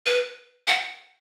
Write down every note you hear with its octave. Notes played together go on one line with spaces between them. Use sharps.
B4
F#5